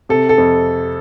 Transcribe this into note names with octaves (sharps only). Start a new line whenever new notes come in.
C3 A4
A4
F2